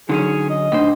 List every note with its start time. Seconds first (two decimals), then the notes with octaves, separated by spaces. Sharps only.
0.09 D3 F#3 C#4 D#4 G#4
0.50 D#5
0.72 A#2 A3 D4 C5 D6